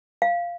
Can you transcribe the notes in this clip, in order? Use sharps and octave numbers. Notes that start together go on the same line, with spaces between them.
F5